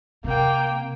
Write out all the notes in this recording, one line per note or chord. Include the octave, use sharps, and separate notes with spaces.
C3 A#3 G5